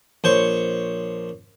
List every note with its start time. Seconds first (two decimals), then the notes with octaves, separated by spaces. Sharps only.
0.24 A#1 C5 C#5 C#6